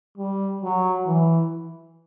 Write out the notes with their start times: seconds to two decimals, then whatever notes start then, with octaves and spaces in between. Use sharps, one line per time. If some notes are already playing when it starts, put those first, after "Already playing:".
0.18 G3
0.62 F#3
1.06 E3